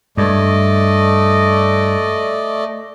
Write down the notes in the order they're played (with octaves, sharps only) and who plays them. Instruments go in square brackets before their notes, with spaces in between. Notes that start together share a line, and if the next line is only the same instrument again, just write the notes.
[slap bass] G2 [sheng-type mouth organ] A3 D5 D#5